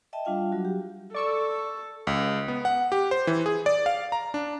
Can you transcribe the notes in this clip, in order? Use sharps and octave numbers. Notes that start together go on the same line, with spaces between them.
D#5 E5 G5 A5
G3 D4 F4 F5 G5
F#3 F#4
G4
A4 D5 C#6 E6
C#2
B3
F#5
G4
C5
E3
G#4
D5
F5
A#5
D4